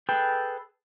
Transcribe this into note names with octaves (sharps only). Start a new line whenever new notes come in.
G#4 A4 B4 G5